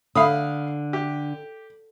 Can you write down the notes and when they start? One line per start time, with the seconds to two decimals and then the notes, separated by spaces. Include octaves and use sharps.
0.15 D3 F5 B5 D#6
0.93 G4